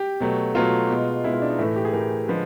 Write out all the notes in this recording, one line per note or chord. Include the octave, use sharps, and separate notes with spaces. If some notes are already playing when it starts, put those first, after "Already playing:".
Already playing: G4
B2 F#3 A3
B2 F#3 A3 F4
B2 G#3
B2 G#3 E4
F4
D4
D#4
A2 E3 A3 E4
G4
G#4
A2 E3 A3 A#4
D3 F3 G#3 B4